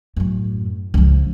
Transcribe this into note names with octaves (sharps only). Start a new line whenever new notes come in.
F#2 A2
C#2 F3